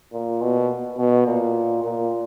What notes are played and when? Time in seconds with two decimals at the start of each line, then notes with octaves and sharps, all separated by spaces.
0.13 A#2
0.41 B2
0.98 B2
1.26 A#2
1.83 A#2